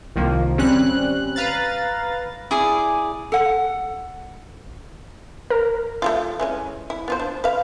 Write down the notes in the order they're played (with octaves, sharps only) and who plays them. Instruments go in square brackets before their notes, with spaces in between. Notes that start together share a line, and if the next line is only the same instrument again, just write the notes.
[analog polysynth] C2 D#3 F3 A#3
G#1 G3 C4 C#4 F#6
B4 F5 A#5 A6
[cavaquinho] E4 G#4 D5
[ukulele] A4 F#5
[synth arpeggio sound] A#4
[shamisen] A3 E4 F4
E3 G#3 C#4
E4
B3 F4 C5
D4
B4 F5